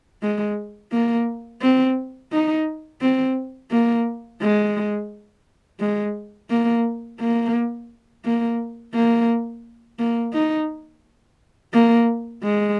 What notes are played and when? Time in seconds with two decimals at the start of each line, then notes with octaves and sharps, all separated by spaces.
0.22 G#3
0.92 A#3
1.62 C4
2.32 D#4
3.01 C4
3.71 A#3
4.41 G#3
5.80 G#3
6.50 A#3
7.20 A#3
8.25 A#3
8.94 A#3
9.99 A#3
10.34 D#4
11.73 A#3
12.43 G#3